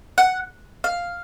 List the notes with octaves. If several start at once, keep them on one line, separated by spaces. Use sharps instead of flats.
F#5
F5